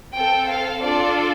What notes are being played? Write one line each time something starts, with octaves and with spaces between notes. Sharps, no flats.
C4 A4 G5
F5
D4 F4 A4 D5